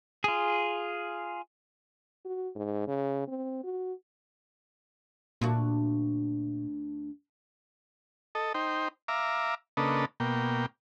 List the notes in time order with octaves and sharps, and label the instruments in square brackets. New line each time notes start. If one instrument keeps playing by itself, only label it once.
[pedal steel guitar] F4 G#4
[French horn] F#4
G#2
C#3
C4
F#4
[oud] D2 D4 F#4 [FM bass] A#2
[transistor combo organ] A4 D#5
D#4 C5 G5
E5 F5 A#5 D6
C#3 A#3 D4 A4 B4 D#5
B2 A#3 G5